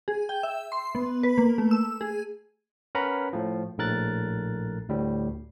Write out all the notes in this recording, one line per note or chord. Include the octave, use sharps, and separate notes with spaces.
G#4
G5
E5
C6
B3
B4
A#3
A3
E6
G#4
C#4 A#4 B4 F#5 A#5 B5
A2 F3
A#1 A2 A4 A#4 F#6 A6
D2 A2 G3